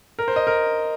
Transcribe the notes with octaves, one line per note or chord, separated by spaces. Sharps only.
A#4
C5
D#5
A#4